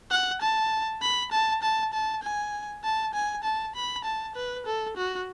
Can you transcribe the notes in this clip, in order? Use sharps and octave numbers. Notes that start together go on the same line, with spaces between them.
F#5
A5
B5
A5
A5
A5
G#5
A5
G#5
A5
B5
A5
B4
A4
F#4